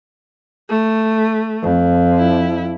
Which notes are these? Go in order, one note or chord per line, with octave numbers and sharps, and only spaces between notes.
A3
F2
E4